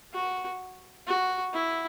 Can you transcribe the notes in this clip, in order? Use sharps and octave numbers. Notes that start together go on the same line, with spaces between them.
F#4
F#4
E4